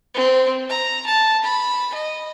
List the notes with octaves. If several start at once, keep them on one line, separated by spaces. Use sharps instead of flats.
C4
A#5
A5
B5
D#5